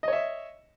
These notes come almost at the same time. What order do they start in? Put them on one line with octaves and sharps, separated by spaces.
D#5 C#5 E5